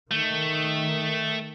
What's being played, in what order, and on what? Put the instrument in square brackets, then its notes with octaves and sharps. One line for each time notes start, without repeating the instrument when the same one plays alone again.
[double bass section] D#3 [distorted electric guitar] A3